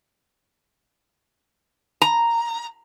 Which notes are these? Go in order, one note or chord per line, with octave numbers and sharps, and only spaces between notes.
A#5